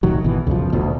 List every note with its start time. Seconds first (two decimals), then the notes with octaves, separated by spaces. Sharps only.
0.03 C2 A2 D#3 F#3
0.23 G#1 B2 E3
0.47 C#2 F#2 B2 F3
0.72 D#1 D2 B2